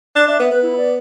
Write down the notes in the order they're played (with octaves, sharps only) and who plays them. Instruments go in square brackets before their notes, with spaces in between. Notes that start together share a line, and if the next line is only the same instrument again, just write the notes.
[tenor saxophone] D4 [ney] D5
[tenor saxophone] D4 [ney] E5
[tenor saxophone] B3 [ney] E5
[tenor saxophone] B3 [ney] B4
[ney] E4
D5